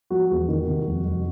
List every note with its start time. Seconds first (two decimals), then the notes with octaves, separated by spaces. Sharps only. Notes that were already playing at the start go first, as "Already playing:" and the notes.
0.10 F3 F#4
0.30 E2
0.48 D#3
0.68 C3
0.87 F2
1.06 F2